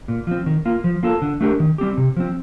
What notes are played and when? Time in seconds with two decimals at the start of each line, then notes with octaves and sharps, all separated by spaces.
0.08 A#2
0.27 F3 C4
0.46 D#3
0.65 A#3 F4
0.84 F3
1.03 A#3 F4 A4
1.22 D3
1.41 A3 D4 G4 A#4
1.60 D#3
1.78 G3 C4 G4
1.97 C3
2.16 F3 C4